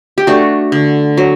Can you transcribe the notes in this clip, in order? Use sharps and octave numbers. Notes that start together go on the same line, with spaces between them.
G4
A3 D4 F#4
D3
F#3